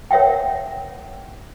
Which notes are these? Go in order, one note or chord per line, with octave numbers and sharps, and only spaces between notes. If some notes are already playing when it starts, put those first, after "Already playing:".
A#4 C#5 E5 F#5 G5